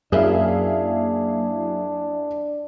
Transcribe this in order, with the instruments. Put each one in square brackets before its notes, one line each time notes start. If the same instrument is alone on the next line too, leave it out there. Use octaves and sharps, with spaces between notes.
[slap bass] F#2 [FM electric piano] F#3 A#3 E4 [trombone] D4 [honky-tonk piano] G#4 E5 F5